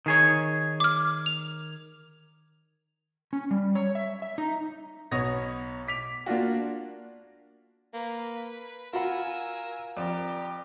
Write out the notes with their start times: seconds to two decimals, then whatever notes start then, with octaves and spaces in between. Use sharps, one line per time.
0.06 D#3 G#4 C#5
0.80 D6 F6
1.26 F7
3.33 C#4
3.51 G3
3.75 C#5
3.95 E5
4.22 E5
4.38 D#4
5.11 B1 B3 C#5 D#6 A#6
5.87 D6 B6 F7
6.26 A#3 D4 F4 F#4
7.94 A#3 B4
8.93 F4 F#4 A#4 F5 F#5 G#5 B5 E6
9.97 F2 G4 A#4 D5